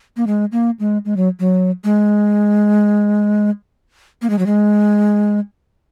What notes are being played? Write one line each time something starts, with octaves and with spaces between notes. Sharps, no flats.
A#3
G#3
A#3
G#3
G#3
F#3
F#3
G#3
A#3
G#3
F#3
G#3